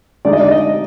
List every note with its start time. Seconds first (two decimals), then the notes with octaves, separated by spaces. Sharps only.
0.25 D3 G#3 D#4 D5
0.33 D#5
0.40 D5
0.52 D#5